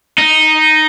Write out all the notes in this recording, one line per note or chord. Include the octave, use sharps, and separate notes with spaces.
D#4